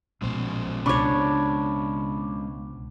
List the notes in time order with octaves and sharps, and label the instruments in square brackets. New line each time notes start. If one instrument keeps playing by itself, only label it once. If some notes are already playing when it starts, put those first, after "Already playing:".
[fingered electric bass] A#1 B2 [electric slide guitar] G#3 C#4 C5
[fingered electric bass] C#2 B2 [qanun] D4 C#5 [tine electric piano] B5 C#6 D6